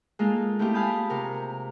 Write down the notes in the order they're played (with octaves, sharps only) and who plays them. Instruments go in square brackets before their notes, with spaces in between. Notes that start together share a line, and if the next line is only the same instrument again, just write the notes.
[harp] G#3 A#3 D#4 F4 A4
A3 C4 E4 F4 G4
F5 G#5 A5 B5 D#6 G6
C3 A#4